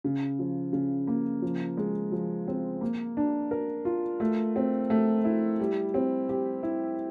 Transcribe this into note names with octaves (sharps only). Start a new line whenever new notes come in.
C#3
F3
C#3
A#3
F3
G#3
F3
C4
A#3
D4
A#4
F4
A3
C4
A3
E4
G3
C4
G4
E4